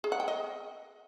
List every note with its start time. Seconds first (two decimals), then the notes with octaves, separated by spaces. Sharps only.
0.04 G#4
0.12 F#5
0.20 G5
0.28 D#5